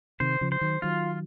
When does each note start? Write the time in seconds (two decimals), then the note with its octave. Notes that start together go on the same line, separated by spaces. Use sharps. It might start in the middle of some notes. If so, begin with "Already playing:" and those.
0.20 C3 D#3 C5
0.41 C#3 F3
0.52 C5
0.61 D#3 F#3
0.82 D#3 F#3 F4